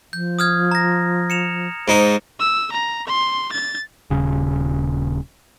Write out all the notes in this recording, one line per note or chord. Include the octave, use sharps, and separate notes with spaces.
F3 G6
D#6 F6 G#6
A#5 A#6
C#7 E7 F7
G#2 D#4 C5
E6
A#5
C6
A6
D#1 C#3